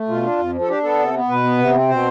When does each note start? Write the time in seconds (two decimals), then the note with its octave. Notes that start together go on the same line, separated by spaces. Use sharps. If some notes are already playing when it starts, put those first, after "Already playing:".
Already playing: A3
0.08 B2 F4
0.23 D4
0.38 F2
0.53 F3
0.61 A4
0.68 D4 G4
0.83 B3 A4
0.99 C3
1.14 B3
1.28 B2 B4
1.43 B3
1.58 C3
1.74 C4
1.89 B2 C5